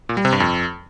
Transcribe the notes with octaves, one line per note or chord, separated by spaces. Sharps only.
A#2
G3
C3
G2
F2